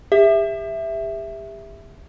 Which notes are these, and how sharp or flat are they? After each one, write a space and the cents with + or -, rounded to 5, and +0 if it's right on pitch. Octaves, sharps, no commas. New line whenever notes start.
G4 +40 E5 +0